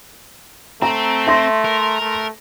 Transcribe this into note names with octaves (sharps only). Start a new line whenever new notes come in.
A3 C4 A#5
E5 C6 A#6
A#4
A3